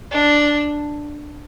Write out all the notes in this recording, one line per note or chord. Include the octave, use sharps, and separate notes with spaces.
D4